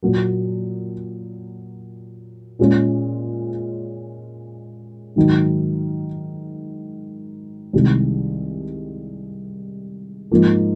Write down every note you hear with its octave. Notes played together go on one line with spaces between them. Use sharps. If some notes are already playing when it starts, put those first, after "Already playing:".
A#2 F#3 A#3
A#2 G#3 C#4 F4
G#2 D#3 F#3
C2 C3 D#3 G#3
G#2 F3 A#3 F4